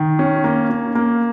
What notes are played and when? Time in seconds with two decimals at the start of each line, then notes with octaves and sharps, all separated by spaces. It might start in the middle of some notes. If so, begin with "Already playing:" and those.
Already playing: D#3
0.19 C#4
0.44 A#3
0.70 C#4
0.95 A#3